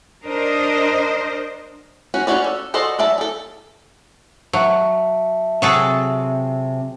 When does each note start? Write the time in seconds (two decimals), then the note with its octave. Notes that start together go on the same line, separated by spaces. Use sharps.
0.23 D4 A#4 C5 D#5
2.14 F#3 C#4 F#4
2.27 C#4 D#4 F#4 C#5 D5
2.44 A4
2.74 F#4 A4 C5 D5 D#5
2.99 F#3 D5 E5 A5
3.18 G#4 A4
4.53 F#3 E5 A5
5.62 C3 F#3 G#4 A4